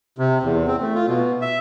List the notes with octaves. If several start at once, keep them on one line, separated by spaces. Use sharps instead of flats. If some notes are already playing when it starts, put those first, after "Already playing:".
C3
E2
C4
A3
F4
B2
E5